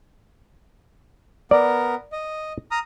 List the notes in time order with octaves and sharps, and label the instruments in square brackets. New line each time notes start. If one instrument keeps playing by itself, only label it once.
[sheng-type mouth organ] B3 A#4 [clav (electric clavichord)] D5
[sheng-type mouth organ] D#5
A#5 D#6 F6